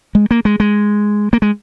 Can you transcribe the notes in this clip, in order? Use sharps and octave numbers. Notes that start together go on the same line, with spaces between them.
G#3
A#3
G#3
G#3
A#3
G#3